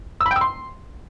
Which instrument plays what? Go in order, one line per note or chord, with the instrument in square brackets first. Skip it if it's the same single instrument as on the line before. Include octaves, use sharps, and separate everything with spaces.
[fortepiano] E6
B5
G5
E6
C6